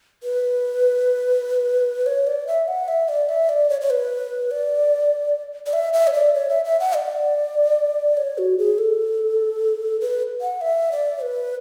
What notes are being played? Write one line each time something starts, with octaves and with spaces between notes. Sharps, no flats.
B4
C#5
D5
E5
F#5
E5
D5
E5
D5
C#5
C#5
B4
D5
D5
E5
E5
C#5
D5
C#5
E5
E5
F#5
D5
C#5
F#4
G#4
A4
B4
F#5
E5
D5
B4